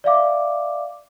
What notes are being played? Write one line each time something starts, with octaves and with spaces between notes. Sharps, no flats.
D5 E5 F5 D6